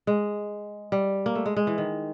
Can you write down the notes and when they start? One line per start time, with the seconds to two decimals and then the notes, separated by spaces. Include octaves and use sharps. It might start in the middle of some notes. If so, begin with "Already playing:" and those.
0.07 G#3
0.92 G3
1.26 A#3
1.35 A3
1.46 G#3
1.57 G#3
1.67 E3
1.78 D#3